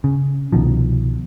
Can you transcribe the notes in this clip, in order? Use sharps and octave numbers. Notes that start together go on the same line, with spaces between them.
C#3
C2 B2 D#3 F3